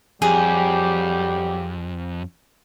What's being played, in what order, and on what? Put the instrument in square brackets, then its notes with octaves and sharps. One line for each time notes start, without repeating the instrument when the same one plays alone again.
[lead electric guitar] F2 [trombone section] F#3 G3 G4 [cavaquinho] G#4